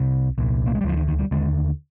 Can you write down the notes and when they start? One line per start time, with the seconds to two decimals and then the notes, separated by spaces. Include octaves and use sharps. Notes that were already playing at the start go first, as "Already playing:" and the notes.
Already playing: C2 C3
0.38 C2 A#2
0.66 A#3
0.75 G#3
0.81 G3
0.84 D2 D3 F3
0.96 D#3
1.08 D#3
1.19 G3
1.31 D#2 D3 G#3